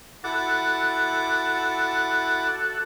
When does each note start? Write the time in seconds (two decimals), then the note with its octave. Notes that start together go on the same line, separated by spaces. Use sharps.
0.24 E4 F#4 A4 F#5 D6